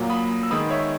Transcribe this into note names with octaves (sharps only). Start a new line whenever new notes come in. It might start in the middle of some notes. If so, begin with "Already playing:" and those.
Already playing: A#2 F#3 A#3
B5 D#6
E6
D#3 G#3 B3 B5 D#6
C#5 E5